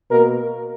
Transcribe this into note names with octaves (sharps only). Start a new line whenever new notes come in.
B2 A#3 A#4